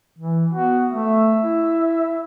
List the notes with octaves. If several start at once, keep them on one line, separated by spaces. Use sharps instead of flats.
E3
B3 F#4
A3 E5
E4